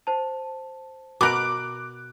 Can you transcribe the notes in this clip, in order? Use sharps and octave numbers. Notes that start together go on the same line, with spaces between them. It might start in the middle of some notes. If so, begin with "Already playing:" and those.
C5 A5
B2 A#4 D6 F#6 D7